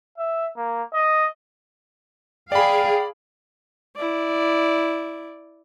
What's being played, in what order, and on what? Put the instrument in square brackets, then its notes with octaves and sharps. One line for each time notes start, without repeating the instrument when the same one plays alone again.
[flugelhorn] E5
A#3
D#5
[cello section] G#4 F5 [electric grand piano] D5 B5 [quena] G5
[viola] E4 D5